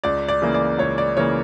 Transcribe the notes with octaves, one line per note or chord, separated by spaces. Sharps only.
C#2 D5
D5
C#3 E3 A#3
D5
C#2 C#5
D5
C#3 E3 A#3 C#5